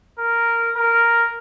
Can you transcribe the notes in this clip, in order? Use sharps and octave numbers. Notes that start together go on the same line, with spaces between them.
A#4
A#4